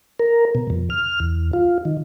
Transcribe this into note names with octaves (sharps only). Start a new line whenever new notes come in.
A#4
B2
F2
F6
E2
F4
D#3